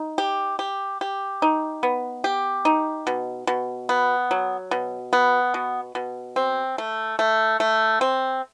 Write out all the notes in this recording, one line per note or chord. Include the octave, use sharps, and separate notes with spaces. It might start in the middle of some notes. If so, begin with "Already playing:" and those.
Already playing: D#4
G4
G4
G4
D#4
B3
G4
D#4
B2
B2
B3
F#3
B2
B3
B2
B2
C4
A3
A3
A3
C4